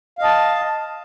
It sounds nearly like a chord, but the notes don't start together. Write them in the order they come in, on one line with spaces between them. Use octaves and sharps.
F5 D#5 A5